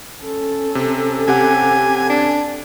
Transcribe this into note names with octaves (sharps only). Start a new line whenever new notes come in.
C#4 A4
C3
C3 G4 F#5 G#5
D4